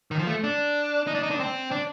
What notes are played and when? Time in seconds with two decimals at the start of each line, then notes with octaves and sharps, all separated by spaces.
0.11 D#3
0.19 F3
0.27 A3
0.44 D4
1.07 D#4
1.15 D4
1.23 D#4
1.31 D4
1.40 C4
1.71 D4